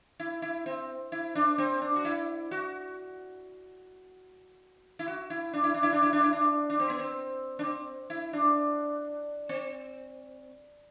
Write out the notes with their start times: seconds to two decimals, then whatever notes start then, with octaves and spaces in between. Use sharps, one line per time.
0.20 E4
0.42 E4
0.66 C4
1.12 E4
1.35 D4
1.58 C4
1.82 D4
1.96 F#4
2.05 E4
2.51 F#4
4.99 E4
5.08 F#4
5.30 E4
5.53 D4
5.64 E4
5.74 D4
5.83 E4
5.93 D4
6.03 E4
6.13 D4
6.23 E4
6.33 D4
6.70 D4
6.80 C4
6.90 B3
7.00 C4
7.59 D4
7.64 C4
8.10 E4
8.33 D4
9.49 C4